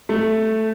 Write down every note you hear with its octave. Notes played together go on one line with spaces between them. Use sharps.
A3